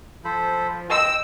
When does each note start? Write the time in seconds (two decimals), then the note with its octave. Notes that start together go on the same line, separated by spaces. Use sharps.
0.25 F3 A4 C5 B5
0.90 D#5 G5 E6